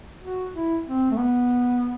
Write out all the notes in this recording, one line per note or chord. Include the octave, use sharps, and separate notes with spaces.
F#4
E4
C4
A3
B3